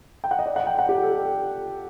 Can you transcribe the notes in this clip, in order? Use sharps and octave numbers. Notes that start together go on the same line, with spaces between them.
G5
F#5
D#5
D5
F#5
G5
F#5
G4
A4